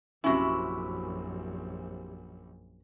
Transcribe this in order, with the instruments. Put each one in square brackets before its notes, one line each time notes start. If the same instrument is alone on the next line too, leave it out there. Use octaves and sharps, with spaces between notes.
[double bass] A#1 F#2 [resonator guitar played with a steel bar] C3 E4 [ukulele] C#4 F#4